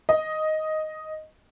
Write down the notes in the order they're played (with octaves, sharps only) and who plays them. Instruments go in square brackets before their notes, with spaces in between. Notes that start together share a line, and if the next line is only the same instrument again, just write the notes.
[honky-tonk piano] D#5